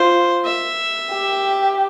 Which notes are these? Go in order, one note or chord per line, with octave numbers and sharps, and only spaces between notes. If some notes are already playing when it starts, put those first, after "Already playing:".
Already playing: F4 C5
E5
G4